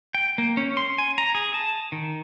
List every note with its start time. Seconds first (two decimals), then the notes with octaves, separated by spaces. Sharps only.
0.15 G5
0.38 A#3
0.57 C#4
0.77 C6
0.98 G#5
1.18 A#5
1.35 G#4
1.54 A5
1.92 D#3